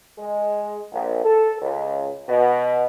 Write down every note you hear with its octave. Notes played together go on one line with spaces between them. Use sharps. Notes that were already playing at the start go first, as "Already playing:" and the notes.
G#3
A#1
A4
C#2
B2